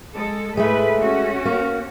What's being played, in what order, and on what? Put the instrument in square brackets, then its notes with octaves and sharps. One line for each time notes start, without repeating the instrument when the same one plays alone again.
[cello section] G#3 A4
[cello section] A2 B4 [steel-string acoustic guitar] G#3 A3
[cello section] C#4 F#4
[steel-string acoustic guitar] A#3